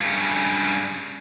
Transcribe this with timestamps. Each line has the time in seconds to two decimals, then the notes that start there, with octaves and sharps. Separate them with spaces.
0.01 G2 C#3